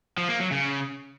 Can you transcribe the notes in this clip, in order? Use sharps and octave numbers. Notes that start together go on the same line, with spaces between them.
F3
A#3
F#3
C#3